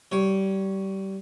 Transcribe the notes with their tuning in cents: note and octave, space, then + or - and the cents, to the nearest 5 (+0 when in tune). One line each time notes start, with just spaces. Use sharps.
G3 -25 C#5 +0